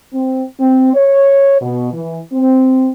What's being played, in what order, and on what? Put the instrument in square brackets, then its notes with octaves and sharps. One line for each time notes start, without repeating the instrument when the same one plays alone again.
[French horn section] C4
C4
C#5
B2
E3
C4